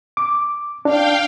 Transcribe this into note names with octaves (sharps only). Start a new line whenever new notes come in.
D6
D4 F5 G5